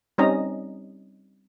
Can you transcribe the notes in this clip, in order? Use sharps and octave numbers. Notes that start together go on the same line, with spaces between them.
G3 C4 C#4 D#4 D#5 A#5